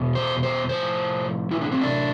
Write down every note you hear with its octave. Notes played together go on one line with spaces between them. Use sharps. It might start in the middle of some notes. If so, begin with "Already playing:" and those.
Already playing: E2 B2
C5
C5
A2 F3 C5
A2 E3 E4
D4
C4
D4